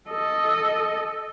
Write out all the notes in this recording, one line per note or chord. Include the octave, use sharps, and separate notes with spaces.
A4 D#5